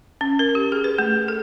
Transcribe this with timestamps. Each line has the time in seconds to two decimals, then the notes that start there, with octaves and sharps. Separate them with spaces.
0.21 C#4
0.39 A#4
0.55 G4
0.72 G#4
0.84 B4
0.98 A3
1.28 A4